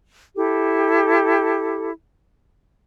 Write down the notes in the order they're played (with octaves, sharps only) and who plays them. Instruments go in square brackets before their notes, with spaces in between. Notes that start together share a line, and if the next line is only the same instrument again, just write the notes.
[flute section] E4 G4 A4